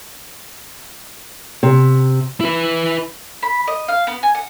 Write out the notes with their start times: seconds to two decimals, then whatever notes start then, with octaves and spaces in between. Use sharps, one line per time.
1.63 C3
2.41 E4 B4
3.43 B5
3.67 D#5
3.88 F5
4.07 B3
4.23 G#5
4.35 F#5